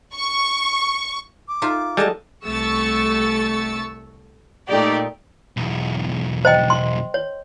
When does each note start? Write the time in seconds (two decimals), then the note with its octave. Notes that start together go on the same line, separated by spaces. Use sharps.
0.15 C#6
1.48 D6
1.62 D#4 F4 E5
1.97 G3 G#3 A4 D#5 A5
2.45 C2 A3 C#6 E6 A6
4.68 A#2 A3 D#4 G4 D5
5.57 B1 E2
6.45 C5 D#5 G5
6.70 C6
7.14 C#5